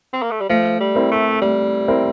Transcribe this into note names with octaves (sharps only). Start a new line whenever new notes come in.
C4
A#3
A3
G3
F3 A3
G3
C4 E4 A#4
A3
G3 A3
C4 E4 A#4